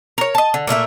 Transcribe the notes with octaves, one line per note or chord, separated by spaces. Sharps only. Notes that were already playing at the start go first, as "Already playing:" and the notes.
A#4 C#5
D#5 A5
D3
A#2 A3 A#3 E5